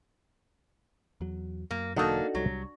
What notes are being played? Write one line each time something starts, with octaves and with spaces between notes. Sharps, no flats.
E2 F#3
F#2 A#3
E1 D3 F#3 A#3 D4 D#4 F#4 A4
C2 F#3 G3